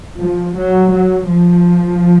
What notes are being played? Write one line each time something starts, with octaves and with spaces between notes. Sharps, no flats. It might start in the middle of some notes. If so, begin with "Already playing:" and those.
F3
F#3
F#3
F3